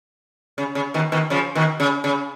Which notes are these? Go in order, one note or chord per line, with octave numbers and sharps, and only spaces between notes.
C#3
C#3
B2 D#3
B2 D#3
C#3 F3
B2 D#3
C#3
C#3